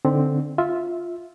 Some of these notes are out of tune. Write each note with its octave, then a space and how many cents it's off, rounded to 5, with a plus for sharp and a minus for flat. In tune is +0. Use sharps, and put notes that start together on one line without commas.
D3 +0 C4 +0 D#4 +0
F4 +0 E5 -10